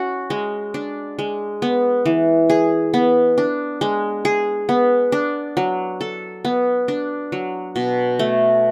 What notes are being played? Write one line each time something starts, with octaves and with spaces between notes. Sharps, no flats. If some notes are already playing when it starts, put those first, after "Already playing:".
Already playing: C#4 F#4
G#3
D4
G#3
B3
E3
G#4
B3
D4
G#3
G#4
B3
D4
F#3
A4
B3
D4
F#3
B2
A3